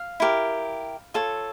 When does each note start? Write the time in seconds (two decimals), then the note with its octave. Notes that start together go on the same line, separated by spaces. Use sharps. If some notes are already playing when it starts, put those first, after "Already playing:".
Already playing: F5
0.20 E4 G4 A#4
1.14 F4 A4 C#5